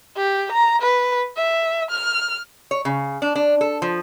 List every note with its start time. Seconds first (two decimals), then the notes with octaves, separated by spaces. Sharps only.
0.17 G4
0.52 A#5
0.82 B4
1.37 E5
1.91 F6
2.71 C#5
2.85 C#3
3.22 D4
3.35 D4
3.61 A4
3.82 F3